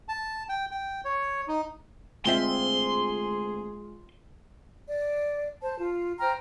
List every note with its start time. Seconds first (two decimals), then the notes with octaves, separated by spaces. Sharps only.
0.09 A5
0.49 G5
0.71 G5
1.05 C#5
1.48 D#4
2.25 D2 G#3 C4 F4 G#4 E5 C6
4.86 D5
5.62 C5 A5
5.78 F4
6.19 C5 G5 A#5 F6